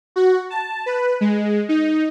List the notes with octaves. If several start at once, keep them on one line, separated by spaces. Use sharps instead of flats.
F#4
A5
B4
G#3
D#4